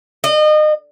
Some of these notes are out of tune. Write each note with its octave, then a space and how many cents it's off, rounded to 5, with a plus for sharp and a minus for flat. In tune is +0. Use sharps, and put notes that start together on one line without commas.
D#5 -30